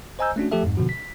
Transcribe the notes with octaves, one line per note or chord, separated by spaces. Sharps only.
C5 D#5 G#5 A#5 E6 G6
A3 C#4 D4 F#4
F3 A3 G4 A4 E5
F2 G#2
B2 D3 F3 F#4
B6